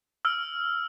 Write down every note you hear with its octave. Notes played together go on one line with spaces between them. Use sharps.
E6 F6